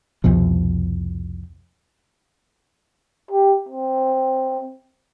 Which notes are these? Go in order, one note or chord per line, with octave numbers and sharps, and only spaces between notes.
C2 F2 B2 F3
G4
C4